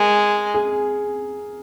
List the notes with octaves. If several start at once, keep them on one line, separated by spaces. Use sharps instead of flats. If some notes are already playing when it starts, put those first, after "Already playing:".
Already playing: G#3 A#4
G#4